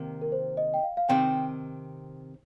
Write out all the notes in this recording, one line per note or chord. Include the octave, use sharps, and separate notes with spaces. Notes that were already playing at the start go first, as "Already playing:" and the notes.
Already playing: C3 D#3 A#3
A#4
C5
D#5
G5
F5
F5
C3 D#3 C4 G5